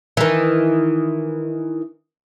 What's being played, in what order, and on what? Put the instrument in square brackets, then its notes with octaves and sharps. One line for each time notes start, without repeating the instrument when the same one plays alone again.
[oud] D#3 E3